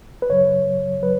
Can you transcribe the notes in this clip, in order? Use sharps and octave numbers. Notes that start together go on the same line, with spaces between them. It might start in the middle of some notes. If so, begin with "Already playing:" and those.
B4
F#2 C#3 F#3 C#5
F#3 B4